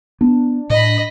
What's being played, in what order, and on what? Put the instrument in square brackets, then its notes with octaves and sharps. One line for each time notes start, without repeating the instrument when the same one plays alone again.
[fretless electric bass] B3 [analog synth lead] D4
[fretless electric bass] A2 [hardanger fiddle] D#5 B5